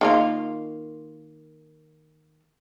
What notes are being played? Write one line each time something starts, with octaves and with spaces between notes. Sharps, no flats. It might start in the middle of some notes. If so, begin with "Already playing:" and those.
D#3 A#3 F4